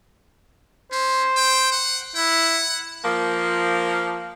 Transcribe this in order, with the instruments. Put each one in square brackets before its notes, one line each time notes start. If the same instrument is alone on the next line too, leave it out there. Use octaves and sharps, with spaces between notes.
[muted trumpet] C#4 [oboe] C5
[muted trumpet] G5
F#5
[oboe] E4 [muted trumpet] F#5
[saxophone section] F3 A#3